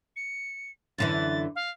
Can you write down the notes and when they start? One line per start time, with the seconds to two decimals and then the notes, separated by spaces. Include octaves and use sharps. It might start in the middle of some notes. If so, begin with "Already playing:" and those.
0.16 C#7
0.98 F#2 D3 E3 A6
1.55 F5